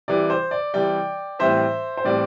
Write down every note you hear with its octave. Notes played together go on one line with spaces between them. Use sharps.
C3 E3 G3 D5
C5
D5
C3 E3 G3 D5 G5
A2 E3 G3 C4 C5 E5
C5
A2 E3 G3 C4 D5